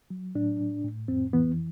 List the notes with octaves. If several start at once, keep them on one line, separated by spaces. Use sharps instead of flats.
F#3
A2 D4
A2
A2
F2 C4
E3 B3